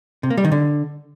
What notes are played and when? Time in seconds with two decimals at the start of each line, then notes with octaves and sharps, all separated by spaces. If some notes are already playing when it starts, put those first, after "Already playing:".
0.23 C3
0.30 A#3
0.37 G3
0.45 D#3
0.52 D3